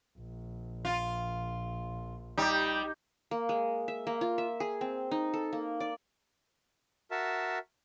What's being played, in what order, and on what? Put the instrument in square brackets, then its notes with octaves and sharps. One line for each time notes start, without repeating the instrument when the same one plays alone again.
[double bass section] A#1
[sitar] F4
[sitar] G3 [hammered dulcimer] D#4 G4
[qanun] A#3
G#3
E5
A#3
F4
E5
G#4
C4
D#4
A4
A#3
D5
[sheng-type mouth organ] F#4 A#4 E5 A5